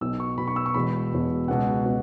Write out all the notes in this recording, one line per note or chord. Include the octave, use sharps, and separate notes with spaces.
B1 B2 E6
C#6
B1 B2 B5
C#6
E6
C#6
E1 E2 B2 B5
E1 E2 B2
C#2 B2 F#5
B2